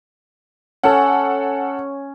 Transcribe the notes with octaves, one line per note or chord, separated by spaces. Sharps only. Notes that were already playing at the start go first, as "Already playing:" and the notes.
C#4 A4 F#5